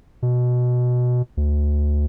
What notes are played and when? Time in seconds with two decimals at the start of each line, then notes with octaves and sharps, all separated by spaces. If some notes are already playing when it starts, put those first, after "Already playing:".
0.22 B2
1.37 D2